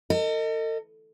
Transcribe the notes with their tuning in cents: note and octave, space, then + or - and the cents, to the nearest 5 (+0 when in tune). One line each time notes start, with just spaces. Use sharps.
A4 +45 D#5 +0